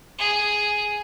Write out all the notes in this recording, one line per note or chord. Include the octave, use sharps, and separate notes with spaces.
G#4